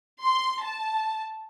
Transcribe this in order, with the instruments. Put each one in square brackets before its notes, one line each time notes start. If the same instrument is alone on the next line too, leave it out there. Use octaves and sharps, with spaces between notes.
[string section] C6
A5